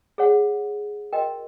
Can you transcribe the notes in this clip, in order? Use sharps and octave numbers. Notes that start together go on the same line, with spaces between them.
G#4 C#5 F#5
F#4 A#4 D#5 G5